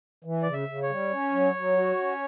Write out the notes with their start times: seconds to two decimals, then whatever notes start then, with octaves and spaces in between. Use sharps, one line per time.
0.25 E3
0.42 C#3 D5
0.53 E5
0.68 C#3
0.82 C#5
0.89 G3
1.12 C#4
1.33 F#3
1.55 F#3
1.77 F#4
1.98 C#4